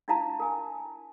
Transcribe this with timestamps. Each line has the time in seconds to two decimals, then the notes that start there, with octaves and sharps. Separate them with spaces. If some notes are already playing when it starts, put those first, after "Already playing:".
0.08 D4 E4 F4 F5 A5 A#5
0.40 A#4 G#5